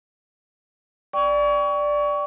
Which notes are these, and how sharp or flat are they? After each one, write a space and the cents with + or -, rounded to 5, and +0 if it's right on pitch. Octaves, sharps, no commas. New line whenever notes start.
D5 +0 G5 +0 C#6 +25